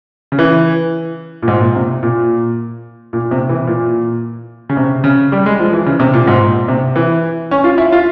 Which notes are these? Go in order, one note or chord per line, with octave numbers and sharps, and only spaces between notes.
C#3
E3
A#2
G#2
A#2
C3
A#2
A#2
C3
E3
A#2
C#3
C3
C#3
G3
G#3
F3
E3
C#3
C3
A#2
G#2
A#2
C3
E3
C#4
F4
E4
F4